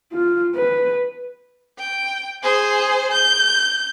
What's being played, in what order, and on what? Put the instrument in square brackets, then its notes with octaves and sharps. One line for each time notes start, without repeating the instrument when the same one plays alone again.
[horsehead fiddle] F4
B4
[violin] G5
G#4 C5
G6